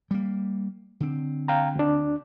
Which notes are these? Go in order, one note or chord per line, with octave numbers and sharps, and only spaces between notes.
G3 A#3
D3 C4
F5 G5 A#5
D2 D4